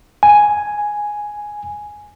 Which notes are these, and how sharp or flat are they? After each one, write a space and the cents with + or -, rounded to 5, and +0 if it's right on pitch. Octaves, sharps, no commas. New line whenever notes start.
G#5 +0